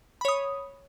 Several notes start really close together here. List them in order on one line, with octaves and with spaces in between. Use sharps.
B5 C#5 D#6